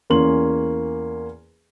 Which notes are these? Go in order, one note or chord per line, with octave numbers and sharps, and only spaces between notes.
E2 A#3 C#4 C6 F#7